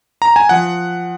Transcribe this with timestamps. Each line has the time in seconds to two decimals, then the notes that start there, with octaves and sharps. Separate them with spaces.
0.22 A#5
0.36 G#5
0.49 F3 F#5